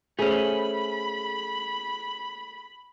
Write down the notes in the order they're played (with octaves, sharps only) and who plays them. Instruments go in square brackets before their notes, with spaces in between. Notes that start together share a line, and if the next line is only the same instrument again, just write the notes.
[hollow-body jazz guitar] A3 C#4 [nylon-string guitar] G#4 C5 [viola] B5